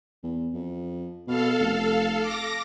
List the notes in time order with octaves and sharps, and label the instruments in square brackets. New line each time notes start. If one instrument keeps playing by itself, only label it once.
[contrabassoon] E2
F2
[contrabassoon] B2 [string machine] A4 F5
[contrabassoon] F1
[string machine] D6 A#6